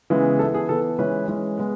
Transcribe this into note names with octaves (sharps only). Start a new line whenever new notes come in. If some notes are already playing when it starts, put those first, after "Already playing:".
C#3 E3 G#3 B3
E3 B3 A4
G#4
E3 B3 A4
E3 G#3 C#4 B4
E3 G#3 C#4
G#3 B3